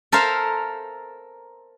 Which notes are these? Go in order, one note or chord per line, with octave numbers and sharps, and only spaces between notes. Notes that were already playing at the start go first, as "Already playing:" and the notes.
A4 A#4 C5 E5 F5